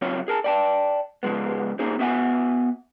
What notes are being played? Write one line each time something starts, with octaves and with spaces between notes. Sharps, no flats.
C#3 F#3 C4 C#4 F4 C#5
G#4 A#4 A5
D5 G5 A5
C#3 F3 G#3 B3
A#3 C#4 D#4 G#4 C5
B3 F#4 E5 F#5 G#5